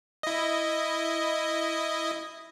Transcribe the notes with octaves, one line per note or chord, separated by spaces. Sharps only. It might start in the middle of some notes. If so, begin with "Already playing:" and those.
E4 D#5